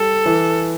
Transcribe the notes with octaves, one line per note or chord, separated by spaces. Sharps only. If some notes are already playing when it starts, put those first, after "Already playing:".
Already playing: G3 A4
E3